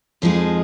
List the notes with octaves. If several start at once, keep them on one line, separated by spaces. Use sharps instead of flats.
F2 F3 G#3 D#4 G#4